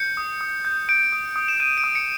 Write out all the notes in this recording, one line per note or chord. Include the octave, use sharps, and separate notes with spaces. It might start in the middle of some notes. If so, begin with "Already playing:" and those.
Already playing: G6 C#7
D#6
D#6
G6
G6 D7
D#6
D#6
E7
G6 D#7
D7
D#6
C#7